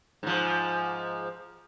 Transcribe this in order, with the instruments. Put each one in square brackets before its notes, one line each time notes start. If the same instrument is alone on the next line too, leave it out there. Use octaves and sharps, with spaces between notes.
[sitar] G#2 F3